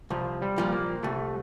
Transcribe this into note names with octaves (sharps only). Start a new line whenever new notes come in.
C2 F3
G3
A#2 F3
A#3
C2 A3